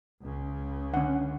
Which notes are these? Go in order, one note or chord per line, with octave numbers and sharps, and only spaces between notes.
C#2 C#3
D3 C#4 F#5